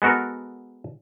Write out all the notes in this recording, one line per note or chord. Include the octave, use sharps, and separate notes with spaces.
G#3 B3 F#4 A4 A#4